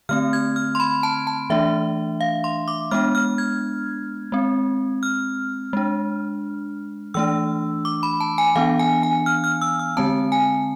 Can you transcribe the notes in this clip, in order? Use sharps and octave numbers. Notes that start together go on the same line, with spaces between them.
D3 A3 C4 F6
G#6
F6
C6
B5
A5
A5
E3 A3 D4 E5
F5
C6
D6
G#3 B3 D4 F6
F6
G#6
G#3 C4
F6
G#3 D4
E3 A3 D4 E6
D6
B5
A5
G#5
E3 B3 D4 F5
G#5
G#5
F6
F6
E6
E6
D3 G#3 C4 A5
G#5